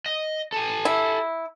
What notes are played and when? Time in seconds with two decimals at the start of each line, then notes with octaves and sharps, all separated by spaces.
0.06 D#5
0.52 A4 G#5
0.85 E4